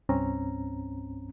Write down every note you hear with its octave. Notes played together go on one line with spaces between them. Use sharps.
C2 G2 C4 C#4 A#5